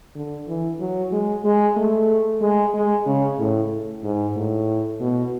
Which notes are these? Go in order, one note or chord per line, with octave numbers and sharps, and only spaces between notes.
D3
E3
F#3
G#3
G#3
A3
G#3
G#3
C#3
A2
G#2
A2
B2